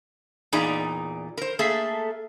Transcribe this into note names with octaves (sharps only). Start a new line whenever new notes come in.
E2 A#2 D#4 G#4 D5 A#5
A#4 C5
A3 A#3 G#4 A4 E5